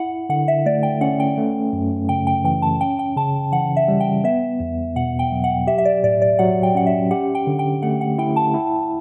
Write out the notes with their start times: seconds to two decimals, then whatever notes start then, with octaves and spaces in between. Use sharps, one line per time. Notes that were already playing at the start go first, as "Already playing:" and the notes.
Already playing: E4 F#5
0.29 D3 F#5
0.48 E5
0.66 A3 D5
0.83 G5
1.01 C#4 F#5
1.20 G5
1.38 A3
1.73 F#2
2.09 C#3 G5
2.27 G5
2.45 E3 G5
2.62 A5
2.81 C#4 G5
2.99 G5
3.17 C#3 A5
3.52 E3 F#5
3.77 E5
3.88 G3
4.00 G5
4.24 B3 E5
4.60 E2
4.96 B2 F#5
5.19 G5
5.32 F#3
5.44 F#5
5.67 G4 E5
5.78 E5
5.85 D5
6.04 A2 D5
6.22 D5
6.39 F#3 F#5
6.63 G5
6.75 C#4 F#5
6.87 E5
7.11 G4 F#5
7.35 G5
7.47 D3
7.59 G5
7.82 A3 F#5
8.01 F#5
8.18 E4 G5
8.36 A5
8.54 E4